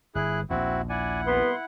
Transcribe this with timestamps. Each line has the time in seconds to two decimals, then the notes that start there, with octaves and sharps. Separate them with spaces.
0.15 G1 E4 G#4 F#6
0.50 A#1 D#2 C4 E4 F#4
0.89 E4 D5 F#5 G#5
1.27 C2 B3 C6